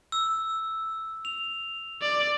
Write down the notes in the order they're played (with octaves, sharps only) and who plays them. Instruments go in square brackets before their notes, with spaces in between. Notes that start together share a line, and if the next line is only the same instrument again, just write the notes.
[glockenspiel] E6
F7
[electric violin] D5